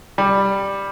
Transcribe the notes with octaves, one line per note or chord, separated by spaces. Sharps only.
G3